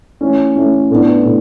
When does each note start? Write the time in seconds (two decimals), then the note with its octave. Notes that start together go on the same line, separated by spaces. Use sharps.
0.21 E3 A3 C#4
0.56 E3 A3 C#4
0.91 A2 E3 B3 D4
1.25 A2